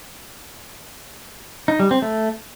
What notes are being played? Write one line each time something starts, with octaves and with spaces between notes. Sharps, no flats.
D#4
G3
C4
A3